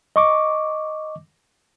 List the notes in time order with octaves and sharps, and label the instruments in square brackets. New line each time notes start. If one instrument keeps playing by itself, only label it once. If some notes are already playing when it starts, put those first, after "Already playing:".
[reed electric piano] D#5 C#6 D6